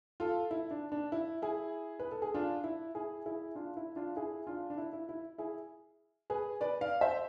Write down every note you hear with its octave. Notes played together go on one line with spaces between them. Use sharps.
F4 A4
E4
D4
D4
E4
E4 G#4
B4
A4
G#4
D4 F4
E4
E4 G#4
E4 G#4
D4 F4
E4
D4 F4
E4 G#4
D4 F4
D4
E4
E4
E4
E4 G#4
G#4 B4
B4 D5
D5 F5
C5 E5